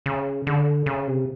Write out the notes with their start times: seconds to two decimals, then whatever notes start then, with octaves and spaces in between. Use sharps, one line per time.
0.06 C#3
0.47 D3
0.86 C#3
1.07 C3